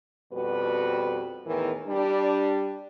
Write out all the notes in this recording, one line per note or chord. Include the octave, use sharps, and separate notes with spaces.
F2 B2 G3 F#4 B4
E2 A2 D#3 E3 A#4
G3 D4